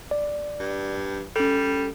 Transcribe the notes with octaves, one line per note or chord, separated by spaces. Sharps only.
D5
G2
G3 C#4 A4